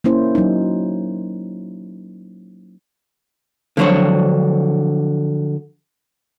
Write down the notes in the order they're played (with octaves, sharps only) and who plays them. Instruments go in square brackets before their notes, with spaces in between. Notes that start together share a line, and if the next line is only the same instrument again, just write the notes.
[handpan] A#3 C#4 E4 C5
F#3 D#4
[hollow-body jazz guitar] D3 F3 F#3 A#4 C5 C#5